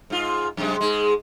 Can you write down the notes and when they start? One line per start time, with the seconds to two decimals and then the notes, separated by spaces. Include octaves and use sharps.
0.10 G#2 F4
0.57 F#2 C3 G#3
0.81 G#2 G#3